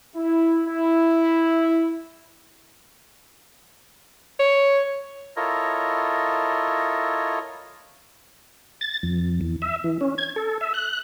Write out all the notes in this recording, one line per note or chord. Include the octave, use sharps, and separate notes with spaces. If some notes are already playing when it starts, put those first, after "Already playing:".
E4
E4
C#5
E4 F4 A4 A#4 C#5 D#5
A6
F2
E2
E5
E3
C#4
G#6
A4
E5
F#6